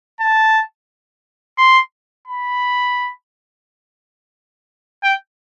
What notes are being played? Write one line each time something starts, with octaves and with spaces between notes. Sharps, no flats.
A5
C6
B5
G5